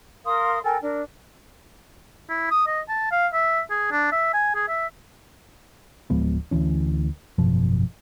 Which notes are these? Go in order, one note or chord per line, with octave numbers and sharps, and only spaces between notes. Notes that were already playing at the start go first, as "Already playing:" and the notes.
A#4 F5 C6 D#6
A4 A#4 G5 G#5
D4 A#4
E4
D#6
D#5
A5
F5
E5
G#4
D4
E5
G#5
G#4
E5
D1 F3 G#3 B3
D2 E3 C#4
G#1 F#2 B2 F3